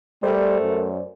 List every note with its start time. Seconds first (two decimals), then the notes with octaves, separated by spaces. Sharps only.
0.23 G3 A3 A#4 C5 D5
0.61 F#2